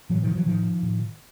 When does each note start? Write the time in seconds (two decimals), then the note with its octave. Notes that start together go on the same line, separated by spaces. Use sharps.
0.10 A2 E3 F#3
0.22 D#3 F3
0.34 E3 F#3
0.46 A2 D#3 F3
0.82 A2